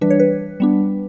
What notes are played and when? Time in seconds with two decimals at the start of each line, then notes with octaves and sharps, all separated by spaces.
0.01 E3 G3 D4 B4
0.10 C#5
0.20 B4
0.60 G3 B3 D4